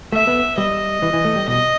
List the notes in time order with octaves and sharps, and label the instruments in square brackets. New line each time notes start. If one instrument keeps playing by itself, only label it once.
[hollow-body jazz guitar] A3 [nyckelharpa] E5
[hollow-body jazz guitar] B3
[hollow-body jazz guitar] G3 [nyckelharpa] D#5
[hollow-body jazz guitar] E3
E3
A3
G3
[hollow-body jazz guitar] B2 [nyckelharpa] D#5